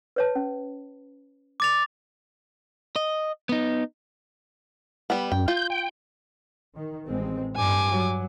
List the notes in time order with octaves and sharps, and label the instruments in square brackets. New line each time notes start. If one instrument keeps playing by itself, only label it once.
[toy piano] B4 C#5 A5
C#4
[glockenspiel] D6 A6 F7
[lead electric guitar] D#5
B3 D#4
[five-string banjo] G3 B3
[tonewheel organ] F#2 [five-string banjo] G5
[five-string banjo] F4 [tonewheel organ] G6
[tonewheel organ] G5
[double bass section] D#3
A1 G#3 C4
[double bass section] G2 [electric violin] G#5 D6
[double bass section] F#3